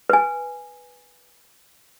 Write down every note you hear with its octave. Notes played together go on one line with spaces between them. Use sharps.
B4 G#5